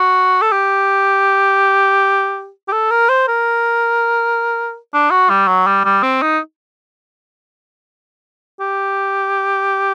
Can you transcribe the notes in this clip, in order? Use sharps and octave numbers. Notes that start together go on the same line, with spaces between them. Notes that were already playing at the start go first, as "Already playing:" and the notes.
Already playing: F#4
A4
G4
G4
A4
A#4
C5
A#4
D4
F#4
G3
F#3
G3
G3
C4
D#4
G4